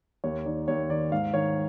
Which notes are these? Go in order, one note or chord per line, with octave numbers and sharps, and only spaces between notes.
D#2 C#5
D#3 D5
D#2 C#5
D#3 D5
G#2 F5
D#3 C#5